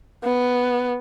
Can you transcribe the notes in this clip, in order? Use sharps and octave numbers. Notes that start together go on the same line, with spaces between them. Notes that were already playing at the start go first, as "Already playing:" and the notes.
B3